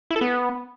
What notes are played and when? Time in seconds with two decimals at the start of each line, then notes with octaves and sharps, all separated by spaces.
0.11 E4
0.16 A4
0.21 B3